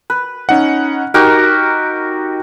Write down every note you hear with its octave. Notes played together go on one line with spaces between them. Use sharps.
B4
C#4 D#4 F#5
D#4 F#4 G4 A#4